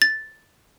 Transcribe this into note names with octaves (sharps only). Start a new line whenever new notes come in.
A6